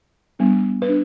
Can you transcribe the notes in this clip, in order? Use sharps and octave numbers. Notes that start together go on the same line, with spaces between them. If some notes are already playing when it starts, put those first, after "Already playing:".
G3 B3 D4
B4
D4